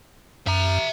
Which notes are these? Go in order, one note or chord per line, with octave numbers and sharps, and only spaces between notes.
F#2 E5 A#5